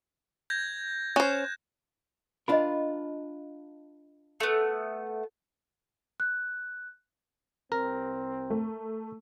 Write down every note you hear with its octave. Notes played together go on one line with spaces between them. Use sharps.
G6 G#6 A#6
C#4 C5 F#6 E7
D4 F4 A#4 D#5 B5
A3 B3
F#6
C2 C3 C4 A#4
A3